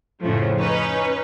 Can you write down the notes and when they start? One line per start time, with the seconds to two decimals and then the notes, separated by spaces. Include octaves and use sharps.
0.21 F2 A2 C#3 F3 A3
0.59 C#4 D#4 B4 C#5